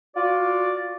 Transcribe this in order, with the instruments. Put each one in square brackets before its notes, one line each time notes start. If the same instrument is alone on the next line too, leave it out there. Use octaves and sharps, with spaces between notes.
[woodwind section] F4 F#4 D5